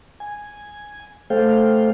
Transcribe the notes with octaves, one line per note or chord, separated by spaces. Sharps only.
G#5
A3 A4 C5 F5 G5